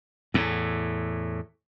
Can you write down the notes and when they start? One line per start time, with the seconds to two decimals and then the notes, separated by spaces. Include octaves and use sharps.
0.34 E2 A2